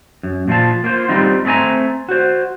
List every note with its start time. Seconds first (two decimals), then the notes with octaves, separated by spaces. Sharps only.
0.23 F#2
0.48 A#2 F3 F4 A5
0.84 A#3 F4 C5
1.08 G3 C4 D#4 F4
1.45 A3 C4 D5 G#5 A#5
2.09 F#4 C5